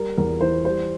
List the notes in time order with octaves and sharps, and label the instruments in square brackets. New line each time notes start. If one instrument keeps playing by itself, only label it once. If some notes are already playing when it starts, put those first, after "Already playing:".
Already playing: [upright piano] G3 A#4
E2 A#4
E3 C5
G3 C5